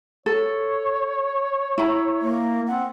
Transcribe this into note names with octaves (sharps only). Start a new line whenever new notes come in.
A4 C#5
E4 A#5
A#3
C4 F#5